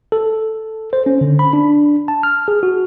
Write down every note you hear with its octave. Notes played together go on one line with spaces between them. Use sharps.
A4
C5
C#4
D3
B5
D4
A5
F6
G#4
F#4